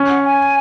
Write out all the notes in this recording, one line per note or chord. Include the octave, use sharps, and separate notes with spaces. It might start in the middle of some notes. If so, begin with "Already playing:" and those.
Already playing: C#4
F#5
G#5